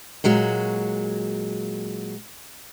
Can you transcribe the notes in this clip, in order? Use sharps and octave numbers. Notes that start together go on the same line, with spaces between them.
A#2 F#3 G#3 F#4